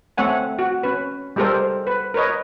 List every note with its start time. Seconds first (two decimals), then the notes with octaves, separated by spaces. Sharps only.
0.17 A3 C4 C#5 F#5 G#5
0.59 F#4
0.83 C#4 B4
1.36 G3 G#3 G4 A4 A#4 C5
1.87 B4
2.14 A#4 B4 C#5 D#5